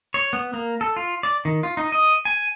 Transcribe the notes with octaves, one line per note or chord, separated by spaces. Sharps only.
C#5
B3
A#3
A4
F4
D5
D#3
F4
D#4
D#5
G#5